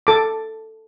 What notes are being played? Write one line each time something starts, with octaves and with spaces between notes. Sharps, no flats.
A4 D6